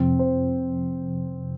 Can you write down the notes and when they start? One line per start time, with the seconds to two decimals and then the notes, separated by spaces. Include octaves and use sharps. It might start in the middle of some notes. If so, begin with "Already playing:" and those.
Already playing: F2 C3 F3 C4
0.19 C5